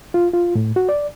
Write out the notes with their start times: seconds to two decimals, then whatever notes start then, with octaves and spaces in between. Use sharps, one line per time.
0.14 F4
0.33 F4
0.55 A2
0.76 F#4
0.89 D5